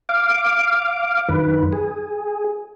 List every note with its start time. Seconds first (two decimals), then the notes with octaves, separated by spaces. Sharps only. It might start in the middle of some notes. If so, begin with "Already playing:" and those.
0.09 F5 D6
1.29 F#2 D#3 B4
1.73 G#4